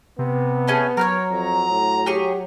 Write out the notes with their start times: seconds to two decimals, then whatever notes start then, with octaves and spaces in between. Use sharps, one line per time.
0.19 C3 B3
0.68 A3 C#4 G#4
0.97 F#3 A#4 B4 C#5
1.31 F2 A#5
1.71 A2
2.06 G4 G#4 C#6